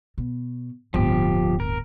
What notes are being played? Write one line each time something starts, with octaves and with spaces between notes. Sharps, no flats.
B2
D1 G1 F3 G4
A#4